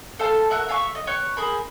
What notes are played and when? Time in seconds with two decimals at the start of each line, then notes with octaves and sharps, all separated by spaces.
0.19 A4 C5 F5 A5
0.50 F#4 A#4 E5 F#6
0.68 E5 F5 G#5 C#6
0.95 D#5
1.07 B4 C#5 G5 C#6
1.37 G#4 A#4 C5 B5